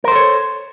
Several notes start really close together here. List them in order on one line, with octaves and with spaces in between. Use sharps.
A#4 C5 A4 C#5